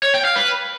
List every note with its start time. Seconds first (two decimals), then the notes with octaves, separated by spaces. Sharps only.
0.03 C#5
0.14 G5
0.25 F5
0.36 B4